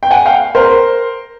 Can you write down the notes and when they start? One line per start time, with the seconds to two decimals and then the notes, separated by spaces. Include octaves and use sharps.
0.03 G5
0.11 F#5 G#5
0.26 F5 G5
0.55 A#4 C5